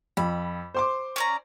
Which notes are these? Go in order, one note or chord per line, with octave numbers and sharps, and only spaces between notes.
F2 B5
C5 C6 D6
C#4 D5 A#5